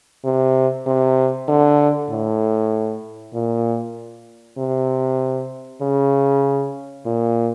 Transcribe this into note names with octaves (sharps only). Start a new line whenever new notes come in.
C3
C3
D3
A2
A#2
C3
C#3
A#2